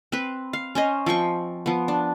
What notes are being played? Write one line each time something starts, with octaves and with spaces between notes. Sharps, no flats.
C4 B4
F5
C#4 C5 D#5
F3 C4 G5 C#6
F3 B3
D4